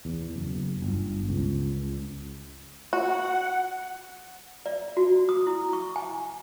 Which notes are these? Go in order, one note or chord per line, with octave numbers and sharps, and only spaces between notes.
E2
F#1
G1
C#2
F#4 F#5
D5
F#4
D#6
E4
C#6
G#5